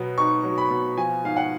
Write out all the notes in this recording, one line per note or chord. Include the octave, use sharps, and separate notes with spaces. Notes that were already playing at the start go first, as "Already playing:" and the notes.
Already playing: B2 F#3 B3
D#4 C#6
F#3
B5
B2
F3 G#5
G#2 F5
F#5